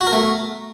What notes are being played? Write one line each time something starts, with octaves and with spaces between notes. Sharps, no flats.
F#4
A#4
A3